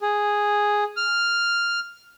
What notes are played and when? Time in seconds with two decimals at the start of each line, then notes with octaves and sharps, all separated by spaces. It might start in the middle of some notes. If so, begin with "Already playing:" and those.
0.01 G#4
0.97 F6